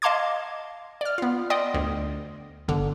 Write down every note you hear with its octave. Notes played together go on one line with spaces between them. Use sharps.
D#5 F5 A5 C6 D6 G#6
D5 F6
B3 F4
D5 D#5 G5 C6 D#6
D2
G1 D3